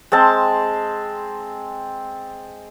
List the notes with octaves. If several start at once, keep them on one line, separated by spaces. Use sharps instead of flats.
G#3 C4 A5